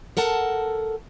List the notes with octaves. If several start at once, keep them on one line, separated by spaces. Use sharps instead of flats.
A4 A#4 F#5 A5